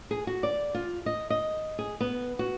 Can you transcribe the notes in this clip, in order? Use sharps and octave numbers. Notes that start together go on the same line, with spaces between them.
G#4
F#4
D5
F4
D#5
D#5
G#4
B3
F#4